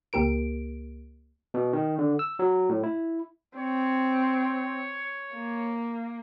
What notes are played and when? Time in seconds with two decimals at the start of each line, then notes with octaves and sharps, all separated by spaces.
0.13 C#2 A#3 G4 A#4 D7
1.54 B2
1.73 D#3
1.98 D3
2.19 E6
2.39 F#3
2.69 A2
2.83 E4
3.58 C4 C#5
5.35 A#3